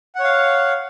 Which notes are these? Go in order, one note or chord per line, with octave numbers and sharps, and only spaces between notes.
C#5 F5 F#5